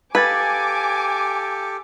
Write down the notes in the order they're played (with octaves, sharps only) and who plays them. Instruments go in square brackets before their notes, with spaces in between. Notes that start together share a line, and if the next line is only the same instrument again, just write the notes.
[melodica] G4 A4 [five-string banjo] B4 [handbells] F5 G#6 A6 [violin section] G#5 D6